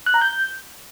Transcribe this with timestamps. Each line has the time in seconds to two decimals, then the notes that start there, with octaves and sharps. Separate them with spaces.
0.06 F#6
0.14 A#5
0.22 G6